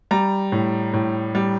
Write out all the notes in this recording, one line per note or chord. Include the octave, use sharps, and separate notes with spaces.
G3 A#5
A2
A2
G3